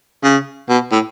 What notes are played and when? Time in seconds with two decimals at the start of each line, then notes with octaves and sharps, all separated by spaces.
0.23 C#3
0.69 B2
0.91 A2